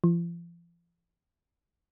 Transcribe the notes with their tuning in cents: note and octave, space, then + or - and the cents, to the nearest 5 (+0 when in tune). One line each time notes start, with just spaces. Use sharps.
F3 -40